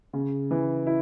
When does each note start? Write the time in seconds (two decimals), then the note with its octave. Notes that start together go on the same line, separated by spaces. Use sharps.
0.13 C#3
0.51 E3
0.87 E4